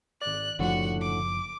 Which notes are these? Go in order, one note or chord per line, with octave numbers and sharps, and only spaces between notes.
G#1 D5 F#6
F#1 A2 D3 F3 F#4 F#5
D6